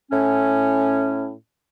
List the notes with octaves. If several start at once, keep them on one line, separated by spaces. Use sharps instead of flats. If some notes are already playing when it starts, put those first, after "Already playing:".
A2 C#4